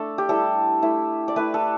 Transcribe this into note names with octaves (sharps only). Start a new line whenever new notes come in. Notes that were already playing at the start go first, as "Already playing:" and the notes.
Already playing: A3 D4 A4
G4
G3 E4 A4
A3 E4
D5
A3 E4 B4
A4